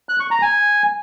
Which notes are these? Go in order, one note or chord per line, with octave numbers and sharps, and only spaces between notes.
F#6
C#6
A#5
G#5